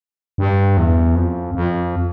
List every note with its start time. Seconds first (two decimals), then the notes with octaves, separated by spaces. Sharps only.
0.38 G2
0.77 E2
1.15 F2
1.55 F2